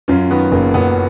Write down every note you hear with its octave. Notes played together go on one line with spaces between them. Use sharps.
F#2 C#4 F4
D#3 B3
F#1 A#3
F#1 B3